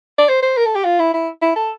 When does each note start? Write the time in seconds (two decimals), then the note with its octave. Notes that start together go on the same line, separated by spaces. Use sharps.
0.18 D5
0.29 C5
0.43 C5
0.57 A#4
0.66 A4
0.76 G4
0.85 F4
1.00 E4
1.14 E4
1.42 E4
1.56 A4